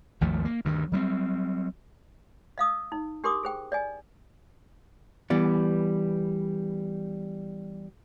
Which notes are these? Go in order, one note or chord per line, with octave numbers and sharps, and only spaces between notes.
G#1 D#2 F3 A3
A#3
D2 G2 D#3
F#3 G3 A#3 C4
D#5 F5 D#6 E6
D#4
D4 G4 A#4 C6 D6 D#6
G#4 C5 G5
D5 D#5 G#5
E3 G3 B3 D5